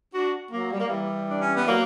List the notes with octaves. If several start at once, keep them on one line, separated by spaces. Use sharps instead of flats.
D4 F#4
F#3 A#3
G3
A#3
E3 G3
D4
C#4
B3
F#3 A#3